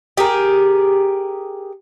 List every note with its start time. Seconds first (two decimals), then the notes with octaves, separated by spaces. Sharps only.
0.17 G4 G#4 A#4